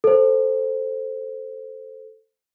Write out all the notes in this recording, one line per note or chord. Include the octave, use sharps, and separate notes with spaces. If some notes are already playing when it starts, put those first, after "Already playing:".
A4 C5